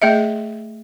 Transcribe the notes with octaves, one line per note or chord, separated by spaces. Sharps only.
A3 G#4 D#5 E5